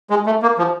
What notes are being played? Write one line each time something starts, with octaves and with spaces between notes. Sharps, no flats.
G#3
A3
A#3
F3